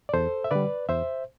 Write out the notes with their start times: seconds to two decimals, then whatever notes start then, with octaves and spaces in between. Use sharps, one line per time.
0.09 D5
0.14 E2 A4 C5
0.44 E5
0.51 D3 G3 B4 D5
0.89 E2 C5 E5